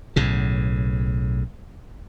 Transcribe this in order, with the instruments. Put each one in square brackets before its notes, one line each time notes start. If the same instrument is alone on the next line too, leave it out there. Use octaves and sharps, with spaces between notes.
[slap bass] B1 A2 C#3